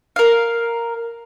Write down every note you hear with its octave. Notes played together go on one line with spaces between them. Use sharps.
A#4 F5